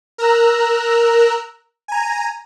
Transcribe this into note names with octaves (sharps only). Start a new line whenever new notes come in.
A#4 A#5 E6 F#6
G#5 A#5